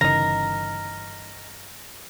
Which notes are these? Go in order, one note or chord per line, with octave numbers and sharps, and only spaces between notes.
G1 C#3 E3 D#4 A#4 A#6